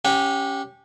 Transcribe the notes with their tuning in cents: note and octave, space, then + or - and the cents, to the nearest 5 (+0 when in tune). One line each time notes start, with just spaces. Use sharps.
C#4 +0 G4 +0 F#5 -30